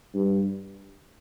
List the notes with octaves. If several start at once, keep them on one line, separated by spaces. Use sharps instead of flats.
G2